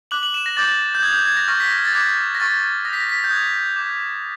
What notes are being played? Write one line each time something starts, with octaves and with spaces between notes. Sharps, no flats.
D6 F#6 F#7
F#7
E7
A#6
D6 G6 A6
G6
D#6 F#6 G#6
G6
G#6
A#6
C#6 F6 A#6
B6
A#6
A6
D6 F#6 G#6
A#6
C#6 F6 A6
D#6 G6 A#6 B6
A#6
B6
A#6
G6
D#6 F#6 G#6
D6 G6